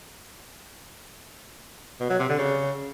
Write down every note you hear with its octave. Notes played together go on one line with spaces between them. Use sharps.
B2
F#3
C3
D3
C#3